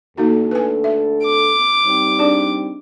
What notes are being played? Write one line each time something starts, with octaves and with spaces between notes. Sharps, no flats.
D2 A#3 D#4 F#4 A4
B4 G#5
E5
D6
G3 C4 D#4
D4 G#4 D5